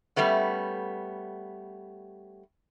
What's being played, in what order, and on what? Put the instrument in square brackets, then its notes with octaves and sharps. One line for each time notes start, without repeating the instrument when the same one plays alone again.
[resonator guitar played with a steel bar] G3 A3 B3 C#4